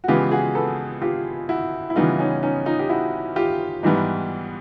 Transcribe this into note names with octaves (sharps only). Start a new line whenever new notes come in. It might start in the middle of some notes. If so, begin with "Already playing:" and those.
F#4
C#3 E3 G#3 B3 F4 G4
F#4 G#4
A4 B4
F4 G4
E4 F#4
E4
C#3 E3 G3 B3 D#4 F4
C#4 D#4
C#4 D#4
D#4 F4
G4
E4 F#4
F4 G4
G#2 E3 G3 B3